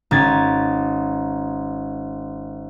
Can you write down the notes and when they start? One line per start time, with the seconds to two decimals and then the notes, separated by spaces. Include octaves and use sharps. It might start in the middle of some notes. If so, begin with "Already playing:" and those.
0.11 G#1 C#4 G#6 A6